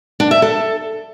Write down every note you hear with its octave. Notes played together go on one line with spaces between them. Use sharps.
D4
E5
A4